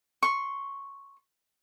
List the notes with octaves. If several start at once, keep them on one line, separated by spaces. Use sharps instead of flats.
C6 C#6